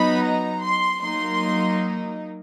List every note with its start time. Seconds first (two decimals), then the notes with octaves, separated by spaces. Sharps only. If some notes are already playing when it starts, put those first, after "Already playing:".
Already playing: F#3 B3 D#4 B5
0.23 A#5
0.62 C6
1.01 F#3 A#3 D#4 C6